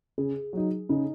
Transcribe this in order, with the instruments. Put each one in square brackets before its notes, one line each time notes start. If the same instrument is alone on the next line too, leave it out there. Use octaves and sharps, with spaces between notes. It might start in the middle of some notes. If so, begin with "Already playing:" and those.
[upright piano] C#3 [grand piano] G#4
[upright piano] F#3 D#4
[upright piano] C#3 [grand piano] D#4